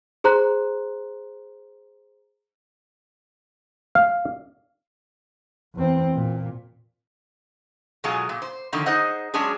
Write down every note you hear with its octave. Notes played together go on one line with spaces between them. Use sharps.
G#4 C5 A#5 C6 F#6
F5
E2 C4
A#2
B2 F#3 G#3 F4 G#4
A#2
C5
D3 D#3 F3 A#3
D#4 G#4 C5 D#5 F#5
F#3 G#3 C#4 D4 G#4